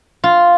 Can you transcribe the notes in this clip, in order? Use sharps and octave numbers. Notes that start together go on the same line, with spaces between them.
F4